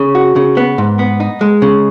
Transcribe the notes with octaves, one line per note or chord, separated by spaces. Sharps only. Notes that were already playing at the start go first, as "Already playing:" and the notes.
Already playing: C#3
F#4
C#3
B3
G#2
B3
D#4
G#3
C#3